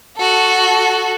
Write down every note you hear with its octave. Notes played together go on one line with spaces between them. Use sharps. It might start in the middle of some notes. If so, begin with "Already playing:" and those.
F#4 A4